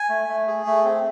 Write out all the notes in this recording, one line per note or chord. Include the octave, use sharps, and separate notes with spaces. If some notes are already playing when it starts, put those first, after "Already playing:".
Already playing: G#5
A3
A3
G#4
A3
C4